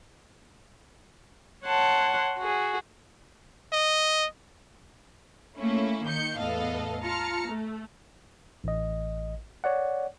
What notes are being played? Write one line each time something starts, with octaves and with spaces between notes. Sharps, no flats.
C#5 F#5 A5 C6
F#4 G#4
D#5
A3 A#3 C#4 E4
D#3 G6 C#7
E2 A2 B3 A4 D#5 F5
F4 A5 A#5 F6 C#7
A3
A1 D#5
C#5 D5 F#5